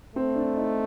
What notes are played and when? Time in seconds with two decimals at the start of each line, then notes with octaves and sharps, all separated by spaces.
0.15 A3 C4
0.35 D4
0.56 D#4